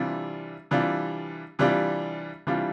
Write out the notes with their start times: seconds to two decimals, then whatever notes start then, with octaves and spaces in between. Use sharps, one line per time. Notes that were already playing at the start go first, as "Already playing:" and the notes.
Already playing: C3 E3 G3 D4 F4
0.71 C3 E3 G3 D4 F4
1.59 C3 E3 G3 D4 F4
2.47 C3 E3 G3 D4 F4